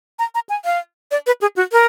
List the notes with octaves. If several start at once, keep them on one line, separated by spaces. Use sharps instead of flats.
A#5
A#5
G#5
F5
D5
B4
G#4
F#4
A#4